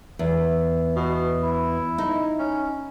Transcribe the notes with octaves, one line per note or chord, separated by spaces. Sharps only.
E2
B2
E4
D#4
C#4